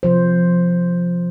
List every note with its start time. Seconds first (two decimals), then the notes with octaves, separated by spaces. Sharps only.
0.03 C3 F3 C5